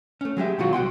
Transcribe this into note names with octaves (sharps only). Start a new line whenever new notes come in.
A3 C#4
F#3 G#3 G4 E5
B2 D#3 F#3 F4 F#4
C2 F#4 G5 C6